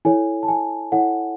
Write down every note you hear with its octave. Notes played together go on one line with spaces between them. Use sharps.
E4 A4 C#5 G#5
A5
G#5
E4 A4 C#5 F#5